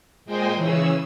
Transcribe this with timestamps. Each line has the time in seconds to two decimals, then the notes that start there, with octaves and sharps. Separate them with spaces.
0.25 A#2 G#3 C5 D#5 G5 G#5
0.55 C#3 E3 C#4 G#4 E6